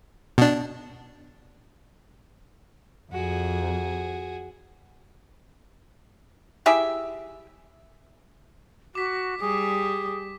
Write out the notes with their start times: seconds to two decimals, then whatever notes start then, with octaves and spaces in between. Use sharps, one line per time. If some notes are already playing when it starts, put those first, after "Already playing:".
0.38 B2 D4
3.13 F2 F#4 G#4
6.66 E4 G4 G#4 E5
8.95 F#4 D6 B6
9.40 G3 G#4